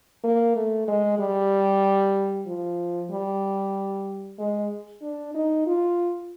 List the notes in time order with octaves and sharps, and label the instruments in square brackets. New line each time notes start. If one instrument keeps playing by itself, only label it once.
[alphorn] A#3
A3
G#3
G3
F3
G3
G#3
D4
D#4
F4